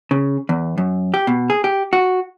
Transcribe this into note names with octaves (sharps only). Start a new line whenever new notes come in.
C#3
E2
F#2
G4
B2
G#4
G4
F#4